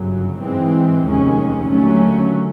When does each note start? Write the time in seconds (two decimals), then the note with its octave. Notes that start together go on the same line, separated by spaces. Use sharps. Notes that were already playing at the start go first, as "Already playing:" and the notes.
Already playing: G1 F#2 C#3 F#3
0.41 G#2 E3 G#3 C4
1.05 F1 D#2 D#3 G#3 C#4
1.69 D#2 D3 F#3 A3 C#4